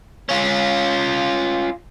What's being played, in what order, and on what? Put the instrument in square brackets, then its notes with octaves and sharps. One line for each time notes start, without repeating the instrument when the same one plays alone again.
[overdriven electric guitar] C#4 F4